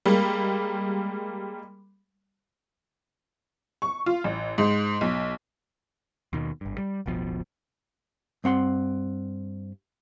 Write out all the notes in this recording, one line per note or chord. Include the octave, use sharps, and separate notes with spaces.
G3 G#3 A#3
C#6
F4
A1
G#2
B1
D#2 B2 D#3
G#1 G2
G3
D1 G1 B2 F3
G2 C4 F#5 C6